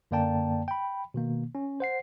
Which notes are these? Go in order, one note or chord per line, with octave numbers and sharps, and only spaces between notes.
F#2 D3 A#3 D5 G5 A5
G5 B5
B2 D#3 A#3
C#4
C5 F#5 C7